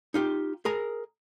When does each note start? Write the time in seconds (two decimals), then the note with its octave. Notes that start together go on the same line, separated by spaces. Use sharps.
0.14 D#4 F4 G4
0.65 G#4 A#4 A#5